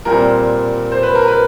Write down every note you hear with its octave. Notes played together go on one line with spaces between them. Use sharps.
A#2 G3 C4 A#4
C5
B4
A#4
B4